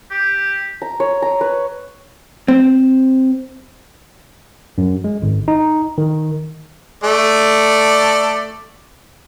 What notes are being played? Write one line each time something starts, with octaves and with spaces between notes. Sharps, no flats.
G4
A#5
C#5
A#5
B4
C4
F#2
G#3
G#1
D#4
D#3
A3 A4 D5